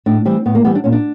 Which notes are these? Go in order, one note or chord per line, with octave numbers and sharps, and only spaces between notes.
A2 D4
E3 G3 C4
A2 B3
A#3
E3 G3 B3
D4
A#2 C#4
D4